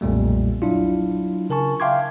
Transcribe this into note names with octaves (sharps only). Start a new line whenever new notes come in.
B1 F2 A#2 G3 A3
F#3 D4 E4 F4
C#3 A#4 G#5 A5 C#6
E5 F5 G5 C6 D6 G#6